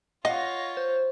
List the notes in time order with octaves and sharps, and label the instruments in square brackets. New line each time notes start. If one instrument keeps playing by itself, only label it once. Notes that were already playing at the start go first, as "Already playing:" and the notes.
[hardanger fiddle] F4 C#5 [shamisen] D#5 [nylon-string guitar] F5 F#5 [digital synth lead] A#6
[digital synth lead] C5